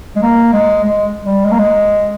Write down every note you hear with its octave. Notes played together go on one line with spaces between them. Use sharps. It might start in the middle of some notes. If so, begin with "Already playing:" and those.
G#3
A#3
G#3
G#3
G3
G#3
A#3
G#3